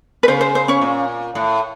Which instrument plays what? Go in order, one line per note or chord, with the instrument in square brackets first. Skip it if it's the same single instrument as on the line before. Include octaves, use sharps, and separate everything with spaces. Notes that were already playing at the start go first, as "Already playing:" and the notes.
[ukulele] B4
[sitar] C#3 [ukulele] C5
[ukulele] C5
C5
C#4 C#5
[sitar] A#2
A2